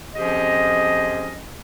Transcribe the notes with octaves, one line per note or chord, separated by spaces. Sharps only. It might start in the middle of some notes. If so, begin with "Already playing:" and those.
F2 F3 C#4 G4 G#4 D#5